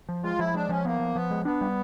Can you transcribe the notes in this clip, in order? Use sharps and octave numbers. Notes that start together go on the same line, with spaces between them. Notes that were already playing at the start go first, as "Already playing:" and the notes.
F3
G#3 F4
F3 E4
G#3 D4
F3 C#4
A#3 B3
F3
F3 B3
G#3
B3 D4
G3